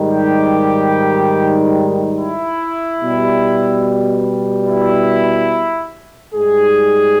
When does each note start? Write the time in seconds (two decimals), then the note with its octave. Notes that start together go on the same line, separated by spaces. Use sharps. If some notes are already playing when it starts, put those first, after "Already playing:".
Already playing: G#2 D#3 G3
0.10 G4
2.17 E4
3.02 B2 G3
4.68 E4
6.35 G#2 G3 G#4